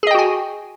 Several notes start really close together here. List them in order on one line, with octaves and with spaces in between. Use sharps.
G#4 D#5 G5 F#4 G#5